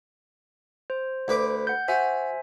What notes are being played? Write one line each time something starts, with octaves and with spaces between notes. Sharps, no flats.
C5
D2 B4 D6
F#5 G6
F#4 C5 E5 G#5